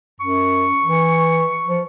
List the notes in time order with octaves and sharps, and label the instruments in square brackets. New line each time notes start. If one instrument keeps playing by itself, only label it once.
[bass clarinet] F#2 [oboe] C#6
[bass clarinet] E3
F3